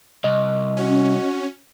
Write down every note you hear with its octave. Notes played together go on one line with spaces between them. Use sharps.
C2 D#5
C#4 F#4